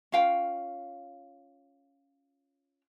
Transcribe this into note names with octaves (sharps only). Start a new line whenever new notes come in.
C#4 F4 F5 G5